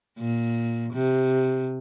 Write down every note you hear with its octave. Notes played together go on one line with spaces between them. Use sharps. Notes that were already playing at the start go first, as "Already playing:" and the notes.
A#2
C3